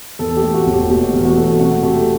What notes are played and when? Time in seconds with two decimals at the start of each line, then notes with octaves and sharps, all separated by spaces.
0.19 E2 A4
0.36 G4
0.42 A3
0.54 F#4
0.67 E1
0.72 G4
0.89 B2 G4
1.13 E2
1.25 F#4
1.37 A3
1.60 C3 F#4
1.83 A3 G4